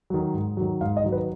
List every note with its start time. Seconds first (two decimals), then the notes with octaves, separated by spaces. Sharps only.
0.10 D#3 F#3
0.34 G#2
0.57 D#3 F#3
0.81 G#2 F5
0.97 D#5
1.04 D#3 F#3
1.12 B4